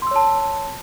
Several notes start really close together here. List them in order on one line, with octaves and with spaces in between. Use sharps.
C6 E6 C#5 A5